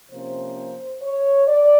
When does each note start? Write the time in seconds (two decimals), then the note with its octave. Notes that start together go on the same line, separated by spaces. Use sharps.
0.10 C3 F3 A#3 C#4 C5
1.01 C#5
1.47 D5